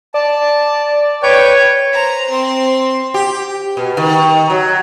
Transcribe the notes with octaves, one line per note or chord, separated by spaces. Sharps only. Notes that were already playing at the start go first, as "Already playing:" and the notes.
D5 A5
B4 C#5 G5 G6
C5 A#5
C4 C6
G4
B2
D#3
F#3